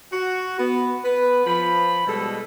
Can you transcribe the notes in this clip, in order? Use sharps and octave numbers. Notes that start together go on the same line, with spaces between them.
F#4
B3
B3 B4
F3 B5
B2 G3 G#3 A4